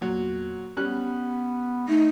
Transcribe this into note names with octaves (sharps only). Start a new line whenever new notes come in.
E2 A#2 F#3
G3 B3 C#4 F#6
A3 D#4